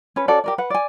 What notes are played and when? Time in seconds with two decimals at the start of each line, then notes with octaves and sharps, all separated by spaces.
0.16 C#4 B4
0.28 C#4 F#4 A4 D5
0.44 G4 A#4 D5
0.58 B4 F#5
0.70 D5 G#5